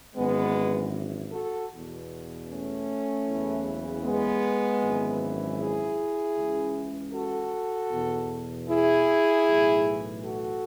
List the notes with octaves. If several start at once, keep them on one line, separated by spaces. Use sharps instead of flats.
G#1 F#2 E3 G#3 B3
F#4 A4
E2 B2
A3 C#4
F#1 E2 C#3 E3
G#3 B3
G#1 F#2 C#3 E3
E4 G#4
C#2 C#3 E3
F#4 A4
E2 B2
E4 G#4
B1 A2 E3
F#4 A4